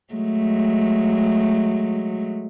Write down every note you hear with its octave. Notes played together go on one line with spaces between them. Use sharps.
F#3 G#3 A3